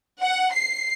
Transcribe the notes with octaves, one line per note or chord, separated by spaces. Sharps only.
F#5
C7